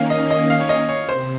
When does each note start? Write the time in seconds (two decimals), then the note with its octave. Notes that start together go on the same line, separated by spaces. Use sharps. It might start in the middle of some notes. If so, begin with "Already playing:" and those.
Already playing: D#3 A#3 C#4 F5
0.10 D#5
0.30 D#5
0.50 F5
0.60 C#5
0.69 D#5
0.89 C#5
1.09 C3 C5